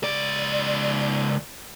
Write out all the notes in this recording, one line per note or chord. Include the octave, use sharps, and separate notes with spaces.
C#2 D5